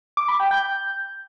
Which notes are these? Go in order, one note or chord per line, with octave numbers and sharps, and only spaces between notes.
D6
B5
G5
G6